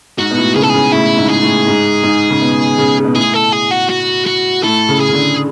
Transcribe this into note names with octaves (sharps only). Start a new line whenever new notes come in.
G#2 F#4
B2
A2
C#3 G#4
A4
C#3 G#4
A2 E4
G#2
G#4
A2
G#2
G#2
C#3
B2
C#3
B2
A2 G#4
A4
G#4
F#4
F#4
F#4
A2 A4
C#3
G#4
C#3
D3